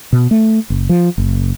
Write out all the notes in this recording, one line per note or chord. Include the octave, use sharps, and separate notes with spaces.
B2
A3
F#1
F3
F#1